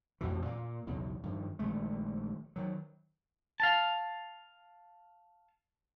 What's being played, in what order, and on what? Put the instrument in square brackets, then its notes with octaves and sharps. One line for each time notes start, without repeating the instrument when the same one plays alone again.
[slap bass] A1 F2 B2 E3
A#2 A#3
B1 E2 C#3
G2 D#3 F3
A#1 D#3 G#3 A3
D#3 F#3
[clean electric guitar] F5 A5